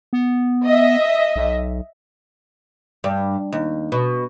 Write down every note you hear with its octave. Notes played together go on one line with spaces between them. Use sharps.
B3
D#5 E5
B1
G2
D#2
B2